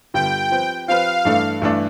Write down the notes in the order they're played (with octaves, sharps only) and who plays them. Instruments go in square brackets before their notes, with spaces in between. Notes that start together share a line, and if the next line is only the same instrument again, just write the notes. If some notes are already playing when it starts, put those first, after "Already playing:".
[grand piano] G2 D3 G3 B3 F4 [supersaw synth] G5
[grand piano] F3 C4 G4 B4
[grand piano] F3 C4 G4 B4 [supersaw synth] F5
[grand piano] G2 E3 A3 D4 A4
G2 E3 A3 D4 A4